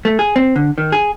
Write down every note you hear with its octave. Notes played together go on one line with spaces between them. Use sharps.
A3
G#4
C4
D3
D#3
G#4